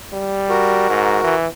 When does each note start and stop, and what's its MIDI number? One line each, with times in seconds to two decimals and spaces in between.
0.13 0.86 55
0.49 1.36 66
0.49 1.36 70
0.90 1.19 44
1.24 1.47 52